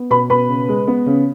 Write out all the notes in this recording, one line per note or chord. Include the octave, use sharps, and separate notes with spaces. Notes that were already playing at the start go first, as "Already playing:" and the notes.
Already playing: B3
B2 B4 B5
B2 B4 B5
C#3
G#3
B3
C#3